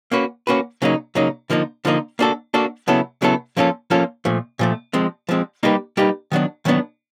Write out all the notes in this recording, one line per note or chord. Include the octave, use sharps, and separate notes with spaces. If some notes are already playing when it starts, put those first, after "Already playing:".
A#3 C#4 F#4 B4
A#3 C#4 F#4 B4
C#3 F#3 A#3 D#4
C#3 F#3 A#3 D#4
D3 F3 A#3 D#4
D3 F3 A#3 D#4
A#3 D4 F#4 A4
A#3 D4 F#4 A4
C#3 F#3 B3 E4 A4
C#3 F#3 B3 E4 A4
F3 A#3 C#4 F4 A4
F3 A#3 C#4 F4 A4
A#2 F3 A3
A#2 F3 A3
F3 G#3 C4
F3 G#3 C4
G3 A#3 D#4 G4 B4
G3 A#3 D#4 G4 B4
D#3 F#3 B3 D4
D#3 F#3 B3 D4